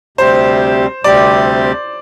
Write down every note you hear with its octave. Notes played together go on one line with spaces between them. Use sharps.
D2 C3 G3 C4 G4 C5
D2 C3 G3 C4 G4 D5